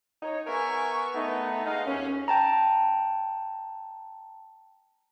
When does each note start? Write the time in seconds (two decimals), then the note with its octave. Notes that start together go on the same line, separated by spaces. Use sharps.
0.23 D#4 C#5
0.47 B3 G#4 A#4 E5 G#5 C#6
1.15 A3 B3 D#4
1.65 G#3 D#4 F5
1.86 D#2 C#4
2.28 G5 A5 A#5